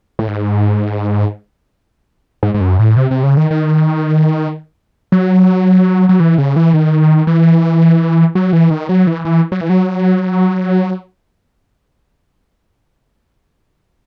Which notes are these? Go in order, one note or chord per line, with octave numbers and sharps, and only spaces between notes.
A2
G#2
G#2
G#2
F#2
A2
C3
C3
C#3
D#3
D#3
F#3
F#3
E3
C#3
E3
D#3
E3
F#3
E3
D#3
F#3
E3
E3
F#3
E3
F#3